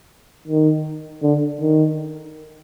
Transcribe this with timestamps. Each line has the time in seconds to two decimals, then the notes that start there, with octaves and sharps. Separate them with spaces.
0.48 D#3
1.22 D3
1.61 D#3